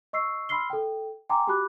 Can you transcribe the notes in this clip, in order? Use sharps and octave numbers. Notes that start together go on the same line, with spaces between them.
D#5 C#6 E6 C7
B5 C6 E6 F6 C7 G7
A4 G5
G5 G#5 A#5 C6 D6
F#4 G4 A5 B5 D6 F#6